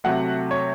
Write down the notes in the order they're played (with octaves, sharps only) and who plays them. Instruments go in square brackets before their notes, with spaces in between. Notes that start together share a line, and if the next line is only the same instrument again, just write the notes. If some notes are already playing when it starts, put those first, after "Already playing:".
[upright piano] C3 F#3 A3 F#5
C#5